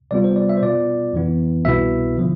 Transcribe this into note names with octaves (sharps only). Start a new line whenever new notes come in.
C3 G3 B3 F4 D5
C5
D5
E5
C5
B2 B3 F4 D5
F2 E3 B3 E4
C2 B2 B3 E4 E5
D3 F3